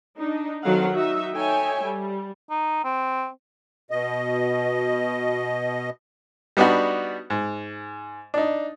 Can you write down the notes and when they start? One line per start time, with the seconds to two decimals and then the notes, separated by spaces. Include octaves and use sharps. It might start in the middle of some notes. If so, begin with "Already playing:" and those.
0.17 D4 D#4
0.63 D#3 F#3 C4 A4 F5 F#5
0.92 D#4 F#4 E5
1.34 D#4 A4 C#5 E5 G5 G#5
1.84 G3
2.50 D#4
2.84 C4
3.91 B2 D#5
6.57 G3 B3 D4 D#4 F#4
7.30 G#2
8.34 D4 D#4